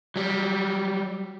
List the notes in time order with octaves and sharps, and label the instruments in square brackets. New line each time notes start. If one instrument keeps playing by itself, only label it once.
[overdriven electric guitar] F#3 G3